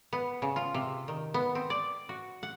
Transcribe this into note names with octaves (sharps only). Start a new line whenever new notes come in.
B3
C#3
F4
C3
D#3
B3
C4
D5
F#4
F#5